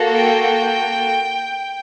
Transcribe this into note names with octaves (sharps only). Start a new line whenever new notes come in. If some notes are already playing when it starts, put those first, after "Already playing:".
Already playing: A#3 F#4 A4
G5